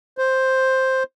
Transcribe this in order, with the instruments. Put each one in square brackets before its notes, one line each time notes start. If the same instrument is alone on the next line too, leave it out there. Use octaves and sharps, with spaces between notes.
[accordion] C5